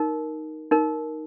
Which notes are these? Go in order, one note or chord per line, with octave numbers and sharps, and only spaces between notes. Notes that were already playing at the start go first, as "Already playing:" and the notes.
Already playing: D#4 A#4
D#4 A#4